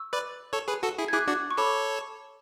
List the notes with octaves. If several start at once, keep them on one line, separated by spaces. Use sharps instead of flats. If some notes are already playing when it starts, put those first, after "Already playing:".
Already playing: C#6 E6
B4 D5
A4 C#5
G#4 B4
F#4 A4
E4 G#4
G#6
E4 G#4 D6 F#6
D4 F#4 D6 F#6
C#6
A4 C#5 B5 D6